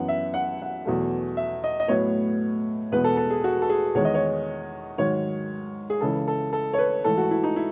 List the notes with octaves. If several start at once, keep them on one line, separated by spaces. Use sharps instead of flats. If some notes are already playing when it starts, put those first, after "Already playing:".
Already playing: F#2 E3 B3 F#5
E5
F#5
F#5
E2 B2 F#3 A3
E5
D#5
D#5
A2 F#3 B3 C#5
E2 B2 G#3 B3 B4
A4
A4
G#4
F#4
A4
G#4
E2 D#3 G#3 C#5
D#5
C#5
G#2 D#3 F#3 C#5
G#4
C#2 C#3 E3 A4
A4
A4
C#5
B4
G#2 E3 A3 A4
F#4
E4
D#4
E4